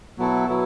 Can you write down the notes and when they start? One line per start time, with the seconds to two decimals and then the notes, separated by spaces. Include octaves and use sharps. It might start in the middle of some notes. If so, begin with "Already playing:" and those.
0.18 B2 F#3 B3 E4 A4
0.48 F#3 B3 E4